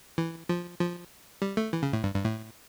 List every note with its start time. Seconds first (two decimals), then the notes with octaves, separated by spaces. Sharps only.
0.18 E3
0.49 F3
0.80 F3
1.42 G3
1.57 A3
1.73 E3
1.83 C#3
1.93 A2
2.03 G2
2.14 G2
2.25 A2